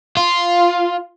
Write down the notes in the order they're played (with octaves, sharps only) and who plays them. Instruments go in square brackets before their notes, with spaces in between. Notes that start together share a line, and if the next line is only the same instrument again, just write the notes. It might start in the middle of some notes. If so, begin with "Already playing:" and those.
[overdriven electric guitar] F4